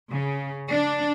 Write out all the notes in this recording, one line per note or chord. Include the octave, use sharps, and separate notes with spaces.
C#3
D4